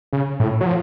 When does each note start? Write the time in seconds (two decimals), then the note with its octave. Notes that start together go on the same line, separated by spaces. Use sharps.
0.13 C#3
0.40 A2
0.61 F#3
0.66 F3